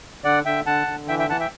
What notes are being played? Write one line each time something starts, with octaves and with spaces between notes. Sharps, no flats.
D3 D5 F#5
D3 E5 G5
D3 F#5 A5
D3
E3 E5 G5
E5 G5
E3 F#5 A5
E5 G5